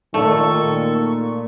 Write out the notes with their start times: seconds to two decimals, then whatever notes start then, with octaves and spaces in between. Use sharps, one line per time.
0.14 A#2 D#3 A3 A4 C#6